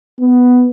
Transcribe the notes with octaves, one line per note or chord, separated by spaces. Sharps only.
B3